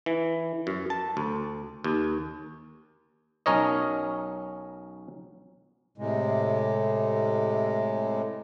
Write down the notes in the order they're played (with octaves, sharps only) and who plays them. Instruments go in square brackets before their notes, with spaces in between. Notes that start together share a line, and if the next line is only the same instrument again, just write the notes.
[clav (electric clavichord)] E3
F#2
A5
D2
D#2
B1 C#4 A#4 C#5 D#5
[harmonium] A2 C3 G#3